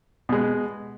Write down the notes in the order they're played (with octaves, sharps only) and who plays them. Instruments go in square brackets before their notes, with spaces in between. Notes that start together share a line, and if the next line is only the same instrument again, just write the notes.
[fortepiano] B2 G#3